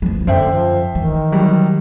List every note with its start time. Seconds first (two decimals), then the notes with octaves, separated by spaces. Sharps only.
0.02 E2 F3
0.27 F#2 D3 C5 E5 G5
0.51 F3
0.95 D#3 E3
1.32 F#3 G3